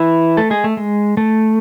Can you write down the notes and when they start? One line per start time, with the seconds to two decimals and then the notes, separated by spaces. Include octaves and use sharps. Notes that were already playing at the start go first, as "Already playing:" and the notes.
Already playing: E3 E4
0.37 A3 A4
0.50 G#3 G#4
0.64 A3
0.77 G#3
1.17 A3